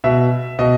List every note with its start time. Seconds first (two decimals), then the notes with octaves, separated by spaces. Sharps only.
0.04 B2 E5
0.59 B2 D#5